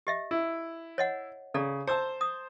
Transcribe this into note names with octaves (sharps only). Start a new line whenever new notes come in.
G4 D#5 E5
E4
C#5 D#5 F#5
C#3 A4 D5 A#5
C5 A5 A#5 D6 E6
D#6